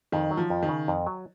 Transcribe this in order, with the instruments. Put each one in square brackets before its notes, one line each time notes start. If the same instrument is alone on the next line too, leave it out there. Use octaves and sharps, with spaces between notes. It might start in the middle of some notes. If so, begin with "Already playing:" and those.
[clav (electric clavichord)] F2 [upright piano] D#3
[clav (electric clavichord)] F#3
[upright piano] F3
[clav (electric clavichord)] F2
[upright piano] D#3
[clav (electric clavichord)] C#3
F2
F#3